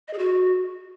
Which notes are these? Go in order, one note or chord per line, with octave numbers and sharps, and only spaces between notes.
D#5
G#4
F#4